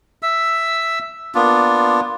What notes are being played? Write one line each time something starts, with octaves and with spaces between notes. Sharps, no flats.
E5 E6
A#3 B3 D4 F4